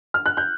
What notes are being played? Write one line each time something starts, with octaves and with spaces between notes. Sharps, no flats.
F6
F#6
G6